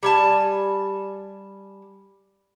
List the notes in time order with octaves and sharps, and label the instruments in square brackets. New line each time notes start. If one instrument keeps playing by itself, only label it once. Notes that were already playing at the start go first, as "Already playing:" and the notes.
[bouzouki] G3 G#5 A5